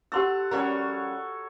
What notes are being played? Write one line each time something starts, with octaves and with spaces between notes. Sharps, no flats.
G4 A4 F#5 C6 E6
F3 G3 C#4 F#4 A4 A#4 C#5